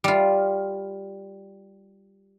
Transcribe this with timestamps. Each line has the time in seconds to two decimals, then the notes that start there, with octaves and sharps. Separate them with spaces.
0.04 G3 F4